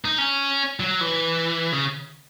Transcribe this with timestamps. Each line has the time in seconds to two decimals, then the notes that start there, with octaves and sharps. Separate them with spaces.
0.05 D#4
0.18 C#4
0.80 F#3
1.01 E3
1.72 C#3